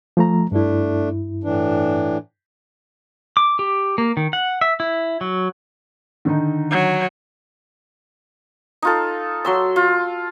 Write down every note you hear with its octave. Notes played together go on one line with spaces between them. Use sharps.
F3 A3 A#5
G2 A3 D4 E4
A2 E3 D4
D6
G4
A#3
D#3
F#5
E5
E4
F#3
D3 D#3 D#4
F#3
D#4 F4 A4
F#3 C6 E6
F4